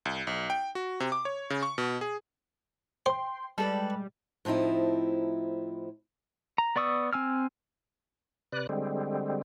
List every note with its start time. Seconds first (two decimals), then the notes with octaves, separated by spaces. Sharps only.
0.05 C2
0.27 B1
0.50 G5
0.75 F#4
1.00 C3
1.12 D6
1.25 C#5
1.50 C#3
1.63 C#6
1.78 B2
2.01 G#4
3.06 C5 G5 C6
3.58 G3 G#3 A4 B4 D5
4.45 A2 F3 C4 D#4 E4
6.58 A#5
6.76 B3 D5 C#6 D#6 E6
7.13 C4 G#5 E6 F6
8.52 C3 B4 D5 F#6
8.69 D3 G3 G#3 C4